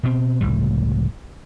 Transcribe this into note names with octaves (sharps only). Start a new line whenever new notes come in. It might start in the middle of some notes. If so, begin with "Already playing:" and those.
B2 C4
F1 C#2 A2 G3